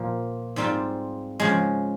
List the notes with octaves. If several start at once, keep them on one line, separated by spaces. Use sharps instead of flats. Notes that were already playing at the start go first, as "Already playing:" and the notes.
Already playing: A#2 F3 A#3
G#2 G3 C4 F4
C#3 F3 G#3